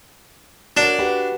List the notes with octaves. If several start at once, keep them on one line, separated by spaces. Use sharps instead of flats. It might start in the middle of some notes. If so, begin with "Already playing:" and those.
D4 F#4 A#4 C#5
F#4 G4 B4